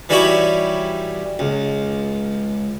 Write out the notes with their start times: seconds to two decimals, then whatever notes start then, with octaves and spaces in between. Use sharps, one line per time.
0.09 E3 G3 D#4 E4 F#4 C#5
1.39 C#2